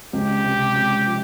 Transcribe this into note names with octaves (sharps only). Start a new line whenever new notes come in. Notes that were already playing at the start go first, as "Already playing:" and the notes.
C#2 G4
C3
C#2
F3